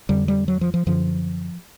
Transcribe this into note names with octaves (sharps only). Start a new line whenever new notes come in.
F2 D3 G3
G3
F#3
F3
F3
F#2 D3 F3